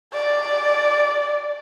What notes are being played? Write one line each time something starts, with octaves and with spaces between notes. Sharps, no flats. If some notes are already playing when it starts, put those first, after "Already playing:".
D5